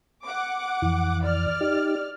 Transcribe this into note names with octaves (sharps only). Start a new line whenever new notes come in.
F#5 D6
F2 E3
D5 F6
D#4 G4